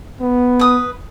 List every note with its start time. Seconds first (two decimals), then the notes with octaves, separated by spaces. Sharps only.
0.20 B3
0.59 B4 D#6